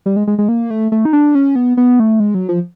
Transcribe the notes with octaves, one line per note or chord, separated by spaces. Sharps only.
G3
G#3
G#3
G#3
A#3
A3
A3
D#4
D4
C#4
B3
B3
A3
G#3
F#3
F3